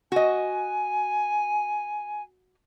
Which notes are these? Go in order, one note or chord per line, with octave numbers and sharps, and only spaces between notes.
F#4 D#5 G#5